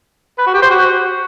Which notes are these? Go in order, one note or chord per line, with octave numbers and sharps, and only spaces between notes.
B4
F#4
G4
C5
F#4